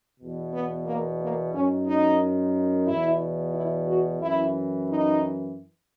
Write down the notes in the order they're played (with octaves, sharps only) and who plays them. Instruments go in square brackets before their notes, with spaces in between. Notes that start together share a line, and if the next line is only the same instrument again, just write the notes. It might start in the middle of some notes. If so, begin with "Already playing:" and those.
[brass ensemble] E2 B2
B3
A#3
A#3
F#2 D#3 C#4
D#4
E2 B2 E4
E4
F#4
F#2 E3 E4
D#4